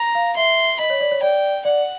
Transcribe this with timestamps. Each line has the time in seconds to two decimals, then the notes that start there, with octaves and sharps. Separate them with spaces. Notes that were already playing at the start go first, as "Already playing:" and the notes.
Already playing: A#5
0.15 F5
0.37 E5 C6
0.79 D#5 B5
0.90 C#5
1.01 D5
1.12 C#5
1.22 D5 G5
1.65 D5 F#5